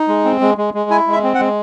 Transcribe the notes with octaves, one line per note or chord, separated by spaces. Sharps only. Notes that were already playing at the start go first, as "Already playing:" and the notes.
Already playing: D#4
G#3
C4
G#3
G#3
G#3
E4 G#5
G#3
E5
C4
F#5
G#3